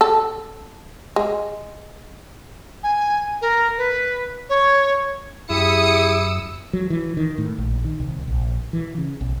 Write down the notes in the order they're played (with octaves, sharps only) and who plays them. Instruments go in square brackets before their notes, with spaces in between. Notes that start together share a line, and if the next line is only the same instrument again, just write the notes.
[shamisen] A4
G#3
[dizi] G#5
A#4
B4
C#5
[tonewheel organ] F#2 E6 [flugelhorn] E4 [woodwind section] G4 G#4 E5 [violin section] D#6 C#7
[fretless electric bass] F#3
E3
D#3
A2
A#1
D#3
C2
A#1
E3
C#3
B1